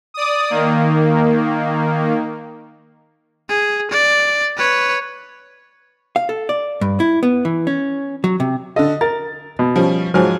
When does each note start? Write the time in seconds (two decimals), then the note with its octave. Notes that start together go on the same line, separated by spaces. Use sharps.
0.14 D5 D#6
0.50 D#3 A#3
3.49 G#4
3.91 D5
4.57 B4 C#5
6.16 F5
6.29 A4
6.49 D5
6.81 G2
7.00 E4
7.23 B3
7.45 E3
7.67 C#4
8.24 F#3
8.40 C3
8.76 D3 A4 D#5
9.01 A#4 A6
9.59 B2
9.76 F3 G3 C#4
10.14 G#2 F3 F#3 G#5 F6